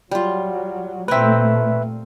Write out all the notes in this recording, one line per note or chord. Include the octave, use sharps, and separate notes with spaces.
F#3 G3 F4
A#2 A3 C4 A#4 B4 E5